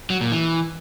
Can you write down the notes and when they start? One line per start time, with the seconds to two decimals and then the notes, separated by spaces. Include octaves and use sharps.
0.10 F#3
0.21 A#2
0.32 E3